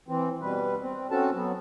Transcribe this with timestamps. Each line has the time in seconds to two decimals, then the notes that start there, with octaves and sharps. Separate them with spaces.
0.08 E3 C4
0.42 B2 G3 B4
0.81 C4
1.11 C4 C#4 F#4 A4 A5
1.34 F#3 B3